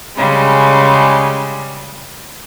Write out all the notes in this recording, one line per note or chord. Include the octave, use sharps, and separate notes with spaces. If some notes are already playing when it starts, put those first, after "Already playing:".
C#3 G3 G#3